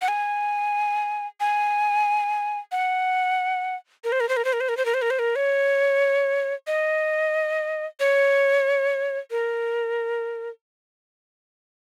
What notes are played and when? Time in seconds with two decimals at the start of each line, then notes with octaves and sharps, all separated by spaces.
0.02 F#5
0.08 G#5
1.40 G#5
2.72 F#5
4.04 A#4
4.12 C5
4.20 A#4
4.29 C5
4.37 A#4
4.45 C5
4.53 A#4
4.60 C5
4.69 A#4
4.77 C5
4.85 A#4
4.94 C5
5.02 A#4
5.10 C5
5.19 A#4
5.36 C#5
6.67 D#5
8.00 C#5
9.31 A#4